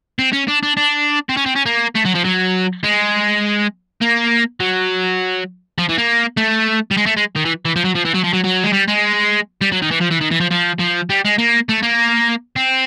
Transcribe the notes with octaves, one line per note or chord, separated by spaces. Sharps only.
C4
C#4
D4
D4
D4
C4
C#4
C4
C#4
A#3
A3
F#3
F3
F#3
G#3
A#3
F#3
F3
E3
A#3
A3
G3
G#3
A3
G#3
D#3
E3
E3
F3
F#3
F3
E3
F#3
F3
F#3
F#3
G#3
G3
G#3
G3
F#3
D#3
E3
F3
E3
D#3
E3
F3
F3
F3
G3
G#3
A#3
A3
A#3
C4